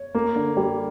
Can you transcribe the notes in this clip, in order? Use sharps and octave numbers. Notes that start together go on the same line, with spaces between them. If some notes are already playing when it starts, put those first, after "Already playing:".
Already playing: C#5
A#3
D3
G3